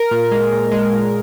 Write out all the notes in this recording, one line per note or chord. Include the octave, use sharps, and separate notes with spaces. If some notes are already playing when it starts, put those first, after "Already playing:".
Already playing: A#4
A#2
G#3
A#2
G#3
A#2